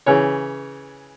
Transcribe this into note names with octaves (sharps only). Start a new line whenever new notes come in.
C#3 E3 C#5